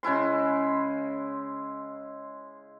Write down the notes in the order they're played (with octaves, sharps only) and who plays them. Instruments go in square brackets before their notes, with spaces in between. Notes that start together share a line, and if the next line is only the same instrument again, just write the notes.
[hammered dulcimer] C#3 G#3 E4 C6